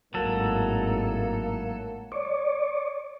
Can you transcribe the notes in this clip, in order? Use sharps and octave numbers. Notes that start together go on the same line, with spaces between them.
G#1 A2 F#3 A#3 A4
C#5 D5